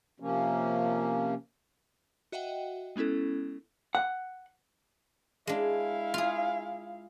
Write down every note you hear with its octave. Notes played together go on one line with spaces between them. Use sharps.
C3 F3 A#3 C#4
F#4 D#5 E5 F#5 G5
G#3 B3 C#4 E4 A4
F#5
G#3 D4 E4 F5
F4 G#4